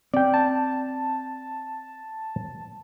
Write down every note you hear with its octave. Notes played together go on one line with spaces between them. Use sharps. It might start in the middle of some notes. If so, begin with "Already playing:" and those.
C4 D5 G5
A5